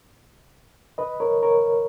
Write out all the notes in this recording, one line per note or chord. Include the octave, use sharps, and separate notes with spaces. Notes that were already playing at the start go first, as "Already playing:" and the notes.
B4 D#5
A#4 C#5
A#4 C#5